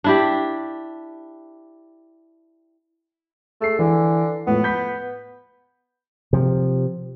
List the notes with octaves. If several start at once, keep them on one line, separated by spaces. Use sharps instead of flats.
D4 E4 G4
A3 G#4 C7
D3 E3
A2 F3 B3
B5 G6 B6
C3 F3